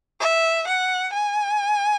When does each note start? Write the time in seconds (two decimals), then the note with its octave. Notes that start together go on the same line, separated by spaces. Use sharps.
0.21 E5
0.68 F#5
1.14 G#5